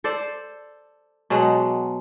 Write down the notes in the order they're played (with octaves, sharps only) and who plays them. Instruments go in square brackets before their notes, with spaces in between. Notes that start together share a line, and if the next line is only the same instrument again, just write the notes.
[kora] A4 C5 D5
B2 F#3 G#3 F#5